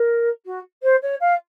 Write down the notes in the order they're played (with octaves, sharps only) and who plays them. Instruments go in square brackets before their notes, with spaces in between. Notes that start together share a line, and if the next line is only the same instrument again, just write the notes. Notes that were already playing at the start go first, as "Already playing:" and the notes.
Already playing: [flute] A#4
F#4
C5
C#5
F5